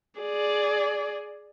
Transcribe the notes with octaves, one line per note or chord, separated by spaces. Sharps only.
G#4 D5